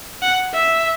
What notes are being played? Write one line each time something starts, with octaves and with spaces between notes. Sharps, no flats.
F#5
E5